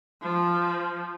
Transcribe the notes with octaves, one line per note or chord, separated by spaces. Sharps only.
F3